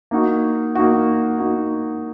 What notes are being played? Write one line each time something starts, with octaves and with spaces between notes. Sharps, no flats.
A#3 D#4 F#4
A#3 D#4 F#4
A#3 D#4 F#4